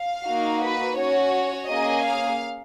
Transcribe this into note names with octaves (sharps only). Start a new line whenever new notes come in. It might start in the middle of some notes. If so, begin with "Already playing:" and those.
Already playing: F5
A#3 D#4 F#4
B4
C#4 F#4 C#5
A#3 C#4 G#4 D#5
F5